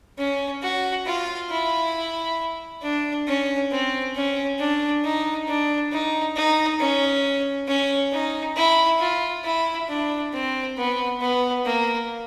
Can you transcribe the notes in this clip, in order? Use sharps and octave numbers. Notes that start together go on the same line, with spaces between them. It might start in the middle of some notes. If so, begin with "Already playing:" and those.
C#4
F#4
F4
E4
D4
C#4
C4
C#4
D4
D#4
D4
D#4
D#4
C#4
C#4
D#4
E4
F4
E4
D4
C4
B3
B3
A#3